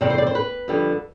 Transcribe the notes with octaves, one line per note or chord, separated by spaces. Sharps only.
E2 C3 G3 D5
C5
D5
C5
B4
F2 D3 G3